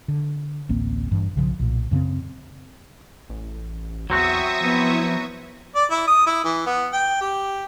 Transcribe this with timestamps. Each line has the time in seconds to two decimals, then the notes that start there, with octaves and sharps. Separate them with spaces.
0.08 D3
0.69 A1 D2 A#3 C4
1.12 G2 E3
1.35 B1 C#3 F3
1.59 B1 A#2
1.91 F#2 C#3 F#3 C4
3.30 A1
4.10 E2 F#3 C4 F#4 E5 C#6 D#6
4.61 F3 B3 E4
5.75 D5
5.91 E4
6.07 D#6
6.27 E4
6.44 E3
6.66 B3
6.93 G5
7.21 G4